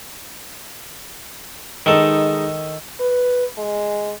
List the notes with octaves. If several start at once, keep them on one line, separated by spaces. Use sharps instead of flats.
D#3 G#3 D#4 A4
B4
G#3